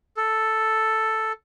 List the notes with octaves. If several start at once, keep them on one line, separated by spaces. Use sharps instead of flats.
A4